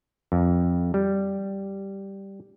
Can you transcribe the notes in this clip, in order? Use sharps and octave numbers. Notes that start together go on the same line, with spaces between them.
F2
G3